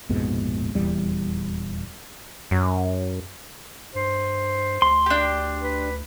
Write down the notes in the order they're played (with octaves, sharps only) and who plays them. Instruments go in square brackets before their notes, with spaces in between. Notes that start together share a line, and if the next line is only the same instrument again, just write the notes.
[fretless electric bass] A#1 F2 G#2 B2
D#1 E2 G3
[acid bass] F#2
[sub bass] G2 [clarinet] C5
[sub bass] D2 [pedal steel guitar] C6
[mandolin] D4 G4
[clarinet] B4